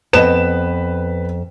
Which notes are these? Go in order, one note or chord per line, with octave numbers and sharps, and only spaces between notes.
F2 B3 B4 D#5 E7